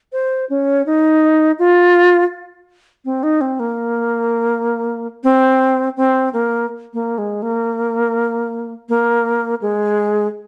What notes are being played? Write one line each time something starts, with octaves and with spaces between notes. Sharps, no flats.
C5
C#4
D#4
F4
C4
D#4
C4
A#3
C4
C4
A#3
A#3
G#3
A#3
A#3
G#3